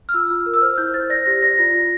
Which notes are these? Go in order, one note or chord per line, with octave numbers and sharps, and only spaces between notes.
F6
F4 E6
F4
A#4
E6
C5 F6
E4 G6
C5 A6
D5 A#6
G4 A#6
D5 A#6
F4 A#6
F4